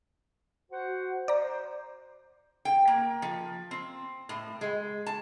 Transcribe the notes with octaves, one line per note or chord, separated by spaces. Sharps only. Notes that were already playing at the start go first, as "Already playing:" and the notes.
F#4 C5 F#5
C5 D5 A#5
G5
A#3
F3
C4
A2
G#3
A5